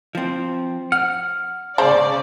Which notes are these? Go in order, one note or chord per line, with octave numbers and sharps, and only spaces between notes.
F3 C4
F#5 F6
C#3 G#3 C5 D5